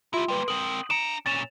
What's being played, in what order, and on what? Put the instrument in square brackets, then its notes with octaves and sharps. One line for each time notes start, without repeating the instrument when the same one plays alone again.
[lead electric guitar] E4 G4 [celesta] F4 E5 C6
[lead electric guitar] G3 A#3 [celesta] B4 C6
[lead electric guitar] C4 A#4 [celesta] D#6 F#7
[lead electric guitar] D4 A#5 [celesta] C#7 D7 E7
[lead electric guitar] A#2 C#4 [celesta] A6 E7 F7